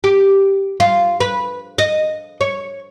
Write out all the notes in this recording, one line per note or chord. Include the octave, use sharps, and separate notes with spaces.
G4
F4
B4
D#5
C#5